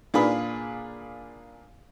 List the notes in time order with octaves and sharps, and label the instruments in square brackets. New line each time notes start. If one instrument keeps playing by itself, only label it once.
[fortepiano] A#2 D4 F4 G#4 B4